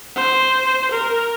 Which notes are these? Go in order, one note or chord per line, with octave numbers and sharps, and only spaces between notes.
C5
A#4